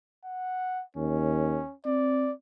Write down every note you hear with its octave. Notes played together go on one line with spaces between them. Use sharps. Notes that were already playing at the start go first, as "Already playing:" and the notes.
F#5
D#2 C#4
C4 D5